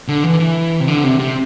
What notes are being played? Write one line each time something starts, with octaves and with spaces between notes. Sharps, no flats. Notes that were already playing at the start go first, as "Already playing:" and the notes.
D3
E3
E3
C3
D3
C3
C3